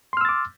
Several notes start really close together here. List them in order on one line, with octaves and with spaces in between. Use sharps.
C6 F6 E6 A6 D6